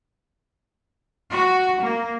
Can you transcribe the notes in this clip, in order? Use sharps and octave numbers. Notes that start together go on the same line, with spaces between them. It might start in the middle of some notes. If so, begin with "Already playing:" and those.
F#4
A#3